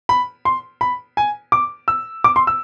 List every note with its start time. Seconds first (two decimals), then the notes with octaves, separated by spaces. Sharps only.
0.09 B5
0.45 C6
0.81 B5
1.17 G#5
1.52 D6
1.88 E6
2.24 D6
2.36 C6
2.47 E6